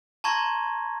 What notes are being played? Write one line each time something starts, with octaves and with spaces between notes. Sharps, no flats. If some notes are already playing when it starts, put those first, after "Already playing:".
A5 A#5 C6 C#6 G#6 A#6